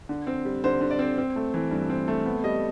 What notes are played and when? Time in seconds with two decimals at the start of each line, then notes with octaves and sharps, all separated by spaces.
0.09 D3
0.27 C4
0.45 G3
0.64 D3 C5
0.81 D3
0.91 D5
0.99 C4
1.18 C4
1.36 A3
1.54 E3
1.71 G2
1.90 C4
2.08 A3
2.25 B3
2.44 G3 D#5